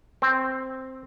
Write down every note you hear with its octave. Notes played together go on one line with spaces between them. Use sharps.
C4